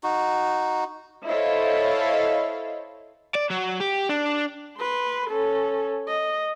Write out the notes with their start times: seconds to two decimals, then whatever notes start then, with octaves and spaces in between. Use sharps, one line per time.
0.03 D#4 F#4
1.26 E4 A4 C5 C#5 D#5 F5
3.35 D5
3.51 F#3
3.81 G4
4.09 D4
4.78 B4 C6
5.30 C#4 A4
6.07 D#5